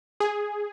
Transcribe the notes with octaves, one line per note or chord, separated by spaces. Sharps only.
G#4